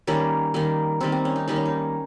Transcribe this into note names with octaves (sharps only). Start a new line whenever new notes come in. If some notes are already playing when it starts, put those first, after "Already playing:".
D#3 G3 A#3 C#4
D#3 G3 A#3
D#3 G3 A#3 C4
C4
C#4
D#4
D#3 G3 A#3 D#4
C#4
D#4